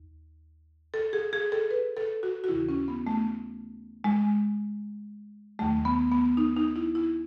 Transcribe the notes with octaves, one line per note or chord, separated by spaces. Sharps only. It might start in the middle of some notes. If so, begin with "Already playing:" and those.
Already playing: D#2
A4
G#4
G#4
A4
B4
A4
F#4
F#4
D#2 C#3 E3 E4
C#4
B3
A3
G#3
D#2 D#3 F#3 A3
B3
B3
D#4
D#4
E4
E4